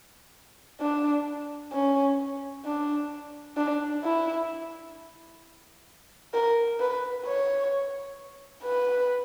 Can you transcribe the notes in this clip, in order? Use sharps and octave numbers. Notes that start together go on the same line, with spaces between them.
D4
C#4
D4
D4
E4
A#4
B4
C#5
B4